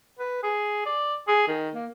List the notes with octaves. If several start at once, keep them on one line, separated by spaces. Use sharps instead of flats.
B4
G#4
D5
G#4
D#3
A#3